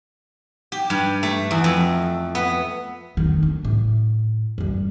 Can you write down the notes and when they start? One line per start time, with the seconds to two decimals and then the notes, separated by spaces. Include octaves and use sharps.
0.72 G4
0.90 G2
1.23 A3
1.51 E2
1.64 F2
2.35 B3
3.17 F2 D#3
3.43 D4
3.65 A2
4.58 F#2 G3